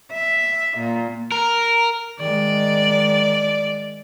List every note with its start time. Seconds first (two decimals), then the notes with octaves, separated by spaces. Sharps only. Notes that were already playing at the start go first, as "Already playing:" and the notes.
0.11 E5
0.76 A#2
1.32 A#4
2.20 D#3 G#3 D5